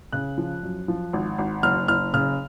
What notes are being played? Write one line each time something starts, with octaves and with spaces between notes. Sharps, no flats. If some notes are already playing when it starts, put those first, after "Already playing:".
C#3 F#6
F3
F#2
F3
G#1
G#1
F#1 F6
F#1 F6
C#3 F6